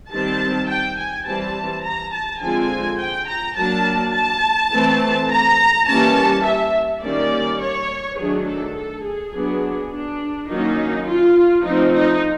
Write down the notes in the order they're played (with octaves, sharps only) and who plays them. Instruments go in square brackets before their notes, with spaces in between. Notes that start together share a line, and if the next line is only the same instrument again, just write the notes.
[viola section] D#3 G3 C4 A5
G5
G#5
E3 G3 C4 A5
A#5
A5
D3 F3 G#3 C4 G#5
G5
A#5
F#3 A#3 D4 A5
A5
E3 A3 C4
A#5
E3 G3 A#3 C#4 A5
E5
D#3 G3 A#3 C#4 D5
C#5
D#3 F#3 A3 D4 G#4
A4
A4
G#4
F#3 B3 D4
D4
D#3 F#3 A#3 C#4 D#4
F4
F3 A3 C4 D#4
D#4